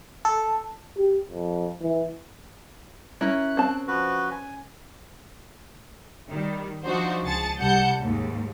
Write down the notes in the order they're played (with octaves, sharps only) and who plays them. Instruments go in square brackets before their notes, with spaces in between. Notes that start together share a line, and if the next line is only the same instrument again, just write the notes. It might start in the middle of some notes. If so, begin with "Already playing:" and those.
[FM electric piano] A4
[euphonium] G4
F2
E3
[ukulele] C#4 A#4 [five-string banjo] E4 [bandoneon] F#6
[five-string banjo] C4 A5
[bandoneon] F3 F#4 B4
G#5
[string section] D#3 G3
F3 D4 D#4 F#4 C5
C#2 G#4 A5 A6 C#7
C2 G3 F#5 A5 G6 C#7
D#2 G#2